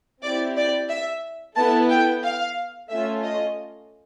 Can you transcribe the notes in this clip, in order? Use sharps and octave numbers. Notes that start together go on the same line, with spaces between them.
C4 E4 G4 D5
D5
E5
B3 E4 A4 A5
G5
F5
A3 C#4 F4 E5
D#5